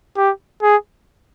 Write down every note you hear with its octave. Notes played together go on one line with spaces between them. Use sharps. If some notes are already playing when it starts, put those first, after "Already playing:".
G4
G#4